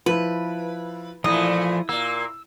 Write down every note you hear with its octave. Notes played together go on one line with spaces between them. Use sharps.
F3 E4 B4
A#2 E3 F3 A3 E4 D#5 D#6
A#2 A#3 E6